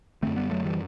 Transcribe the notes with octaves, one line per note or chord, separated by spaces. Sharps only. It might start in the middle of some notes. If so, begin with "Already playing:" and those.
F#2 D3 A3 C4
G3 B3
F#3 A3
E3 G3